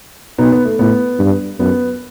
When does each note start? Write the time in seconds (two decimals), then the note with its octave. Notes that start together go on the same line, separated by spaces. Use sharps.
0.38 B2 B3 D#4
0.52 B3
0.65 A3
0.79 A2 B3
1.19 G2
1.59 F#2 B3